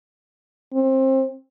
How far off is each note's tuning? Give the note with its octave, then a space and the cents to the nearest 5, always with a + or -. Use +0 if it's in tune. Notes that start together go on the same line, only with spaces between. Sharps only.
C4 +25